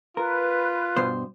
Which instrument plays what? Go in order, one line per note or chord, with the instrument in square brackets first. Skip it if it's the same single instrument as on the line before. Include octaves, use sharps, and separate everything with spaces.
[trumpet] F4 [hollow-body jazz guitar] A#4 [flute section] B4
[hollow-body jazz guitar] G2 B2 C5